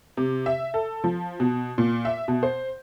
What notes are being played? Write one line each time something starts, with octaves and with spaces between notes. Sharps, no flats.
C3
E5
A4
F3
B2
A#2
E5
B2
C5